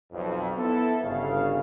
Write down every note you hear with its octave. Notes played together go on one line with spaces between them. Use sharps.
B1 F2
B3 E4 A4
G1 C#3 F5